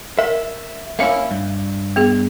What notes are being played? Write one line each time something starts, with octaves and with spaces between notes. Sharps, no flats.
A#4 E5
A#3 C#4 E4 E5 F5
G2
B3 G#4